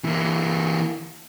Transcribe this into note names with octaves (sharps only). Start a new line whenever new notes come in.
E3 A#3